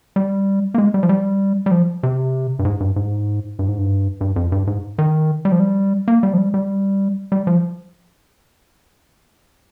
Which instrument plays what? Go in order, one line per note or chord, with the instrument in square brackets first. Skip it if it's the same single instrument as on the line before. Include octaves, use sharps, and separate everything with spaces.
[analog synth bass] G3
A#3
G#3
G3
F3
G3
G3
F3
C3
G2
G#2
G2
G#2
G2
G#2
G2
G2
F2
G2
G#2
D#3
G3
F3
G3
A#3
G3
F3
G3
G3
G3
F3